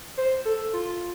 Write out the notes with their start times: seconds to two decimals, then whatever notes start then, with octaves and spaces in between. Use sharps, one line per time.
0.17 C5
0.45 A4
0.73 F4